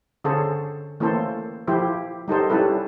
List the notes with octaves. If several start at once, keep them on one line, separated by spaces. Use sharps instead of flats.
D3 C#4 G#4 A4 C5
E3 A3 A#3 C#4 A4 C5
F3 E4 G4 C5
G3 D#4 A4 C5
G3 C#4 E4 A4 B4